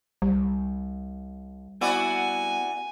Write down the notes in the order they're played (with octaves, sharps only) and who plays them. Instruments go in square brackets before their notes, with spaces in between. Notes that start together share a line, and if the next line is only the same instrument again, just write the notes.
[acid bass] C2 [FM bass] G3
[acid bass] B3 [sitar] E4 F#4 D5 [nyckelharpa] G#5